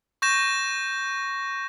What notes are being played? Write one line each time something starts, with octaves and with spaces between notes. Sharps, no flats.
C#6 G6 A#6 E7